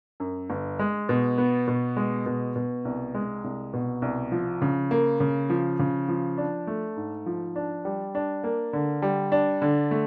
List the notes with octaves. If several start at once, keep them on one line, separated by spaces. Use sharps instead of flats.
F#2
G1
G#3
B2
B3
B2
G#3
B2
B2
C2
G#3
C2
B2
C2
F3
C#3
A#3
C#3
F3
C#3
F3
D4
A3
G#2
F3
D4
G3
D4
A#3
D3
G3
D4
D3
A3